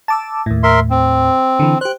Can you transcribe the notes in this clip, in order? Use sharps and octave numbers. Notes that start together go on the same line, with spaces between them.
A5 D6 E6
D#2 A2
A#4 E5 C6
C4
D3 E3
G4 C5 F#6